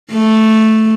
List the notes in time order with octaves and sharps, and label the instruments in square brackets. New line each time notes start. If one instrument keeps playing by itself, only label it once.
[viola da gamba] A3